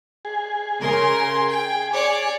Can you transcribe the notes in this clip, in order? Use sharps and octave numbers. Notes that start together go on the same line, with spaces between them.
G#4
C#3 A#4 C6
G5
C#5 D5 D6